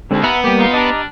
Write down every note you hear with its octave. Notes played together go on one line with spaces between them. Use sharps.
D#2 D3 G#3 C4
B3 E5 F#5 A#5
G3 A#3 G4
D#4 F4
G3 D4 D#5 A#5